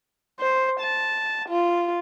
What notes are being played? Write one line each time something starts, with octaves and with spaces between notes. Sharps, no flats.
C5
A5
F4